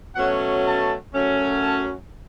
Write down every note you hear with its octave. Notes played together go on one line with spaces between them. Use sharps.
B2 F#3 A3 C#4 F#5
A5
F#2 F#3 A3 C#4
A5